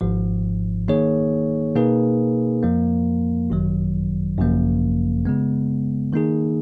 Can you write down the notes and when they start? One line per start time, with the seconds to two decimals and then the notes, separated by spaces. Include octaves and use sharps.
0.01 G#1 G#2 F3
0.88 D#3 A#3 D#4 G#4 C#5
1.75 B2 A#3 D#4 G#4 B4
2.63 F2 F3 A#3
3.50 G#1 F#2 D#3 F#3
4.38 G#1 F#2 C#3 F3 A#3
5.25 C#3 G#3 B3
6.13 D#3 A#3 D#4 G#4